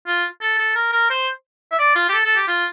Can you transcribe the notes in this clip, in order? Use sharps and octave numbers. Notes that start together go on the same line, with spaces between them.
F4
A4
A4
A#4
A#4
C5
E5
D5
F4
G4
A4
A4
G4
F4